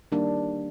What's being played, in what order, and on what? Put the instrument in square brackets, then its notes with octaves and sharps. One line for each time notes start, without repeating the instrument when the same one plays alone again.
[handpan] D#3 G3 A#3 D4